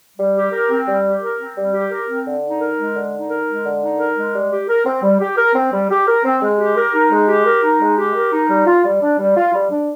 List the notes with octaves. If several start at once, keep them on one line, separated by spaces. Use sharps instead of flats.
G3
G4
A#4
C4
G3
G4
A#4
C4
G3
G4
A#4
C4
D3
D#4
A#4
G#3
D3
D#4
A#4
G#3
D3
D#4
A#4
G#3
G3
G4
A#4
C4
G3
G4
A#4
C4
G3
G4
A#4
C4
G#3
G4
A#4
D#4
G#3
G4
A#4
D#4
G#3
G4
A#4
D#4
G3
F4
G3
D4
G3
F4
G3
D4